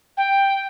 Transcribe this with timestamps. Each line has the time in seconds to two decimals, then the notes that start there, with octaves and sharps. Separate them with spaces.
0.17 G5